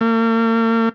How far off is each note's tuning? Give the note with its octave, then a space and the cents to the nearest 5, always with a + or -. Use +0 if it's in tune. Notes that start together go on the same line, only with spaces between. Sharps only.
A#3 -45